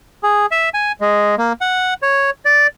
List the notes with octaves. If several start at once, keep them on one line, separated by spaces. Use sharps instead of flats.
G#4
E5
G#5
G#3
A#3
F#5
C#5
D5